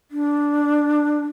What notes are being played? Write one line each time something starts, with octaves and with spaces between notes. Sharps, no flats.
D4